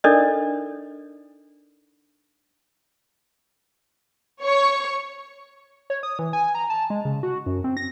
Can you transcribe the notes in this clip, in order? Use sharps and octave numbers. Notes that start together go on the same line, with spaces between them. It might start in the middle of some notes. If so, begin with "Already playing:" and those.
D4 D#4 A4 A#4 D5 D#5
C#5 C#6
C#5
D#6
E3
G#5
A#5
A5
G#3
C#3
F#4
F#2
C4
A#6